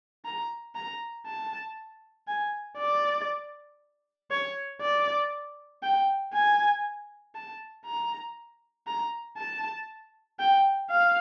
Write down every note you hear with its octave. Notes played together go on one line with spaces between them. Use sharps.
A#5
A#5
A5
G#5
D5
C#5
D5
G5
G#5
A5
A#5
A#5
A5
G5
F5